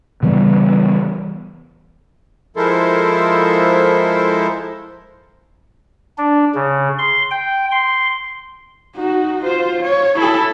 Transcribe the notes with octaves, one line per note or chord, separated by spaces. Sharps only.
C#3 E3 G3 B3
F3 G#3 E4 A4 A#4 C5
D4
C#3
C6
G5
C6
D#4 F#4
F4 C5
C#5
E4 A4